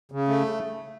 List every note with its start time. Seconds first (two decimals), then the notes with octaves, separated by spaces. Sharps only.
0.12 C#3
0.28 A3